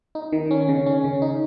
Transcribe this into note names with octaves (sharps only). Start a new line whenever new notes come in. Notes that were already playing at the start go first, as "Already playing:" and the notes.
D#4
D#3
C#4
C#3
C#4
C#3
D#4